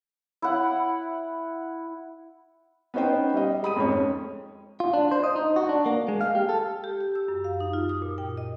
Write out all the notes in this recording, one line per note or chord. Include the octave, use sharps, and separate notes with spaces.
E4 F#5
B3 C#4 D#4 C5 G5
G3 D#5
G#3 B5 D#6 D#7
F2 G#2 C#4 C#5
F4
D4
C5
D#5
D#4
F#4
D4
A#3
G#3
F5
G4
A4
G4
G4
E6
F#2
F5
D#4
F4
D#6
A#2
G5
D#5